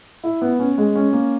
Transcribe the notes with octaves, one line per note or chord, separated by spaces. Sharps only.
E4
B3
C#4
G#3
C#4
A#3